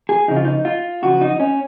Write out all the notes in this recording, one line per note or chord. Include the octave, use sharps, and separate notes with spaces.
G#4
C#3 F3 D#4
F4
D#4
F4
C#3 F3 F#4
D#4
C#4